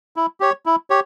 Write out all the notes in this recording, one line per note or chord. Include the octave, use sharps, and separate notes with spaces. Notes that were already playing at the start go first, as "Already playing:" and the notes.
E4
G4 C#5
E4
G4 C#5